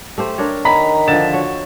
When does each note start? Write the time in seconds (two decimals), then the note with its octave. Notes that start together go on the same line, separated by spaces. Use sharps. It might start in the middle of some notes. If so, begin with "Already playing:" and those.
0.18 A3 G4 C5
0.38 D4 A#4 C#5
0.65 D#3 A#5 B5 B6
1.08 D3 F3 A6 E7
1.33 F#4 C#5